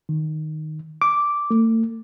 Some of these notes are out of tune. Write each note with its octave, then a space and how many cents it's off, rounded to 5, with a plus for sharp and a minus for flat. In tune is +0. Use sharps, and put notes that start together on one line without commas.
D#3 -5
D6 -5
A3 +40